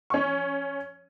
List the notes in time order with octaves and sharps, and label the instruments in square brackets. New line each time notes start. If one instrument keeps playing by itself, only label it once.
[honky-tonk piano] C#4 C#6